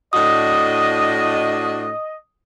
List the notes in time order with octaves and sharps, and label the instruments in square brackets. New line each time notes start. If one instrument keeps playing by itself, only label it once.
[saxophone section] A2 D4 F#4 [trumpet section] D#5 [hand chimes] D#6